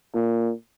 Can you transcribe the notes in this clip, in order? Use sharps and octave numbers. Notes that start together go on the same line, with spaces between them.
A#2